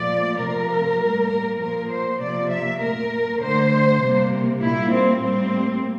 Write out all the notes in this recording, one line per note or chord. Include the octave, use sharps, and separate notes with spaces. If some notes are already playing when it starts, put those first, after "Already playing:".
Already playing: A#2 F3 A3 D5
C3 F3 A3 A#4
A2 G3 A#3
A#4
A#2 F3 A#3 A#4
C5
C3 F3 A#3 D5
E5
A#2 A3 A#4
D3 A3 C5
C3 G3 A#3
A#2 G3 A#3 E4
C4
A2 G3 A#3 C4